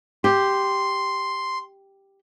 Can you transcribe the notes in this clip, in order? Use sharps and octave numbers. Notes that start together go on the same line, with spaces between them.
G4 C6